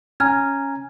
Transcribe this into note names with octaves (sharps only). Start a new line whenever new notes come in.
C#4 G#5 A#5 F6 G#6